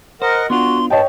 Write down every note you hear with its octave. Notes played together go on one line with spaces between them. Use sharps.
A#4 C5 D#5 F#5
B3 D4 F4 F#4 C6
G2 C#5 D#5 G5 A5